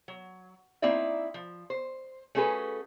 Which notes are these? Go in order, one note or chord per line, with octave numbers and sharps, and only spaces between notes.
F#3
A#3 C4 D#4 E4 D5 E5
F3
C5
A3 C#4 F#4 G#4 A4 B4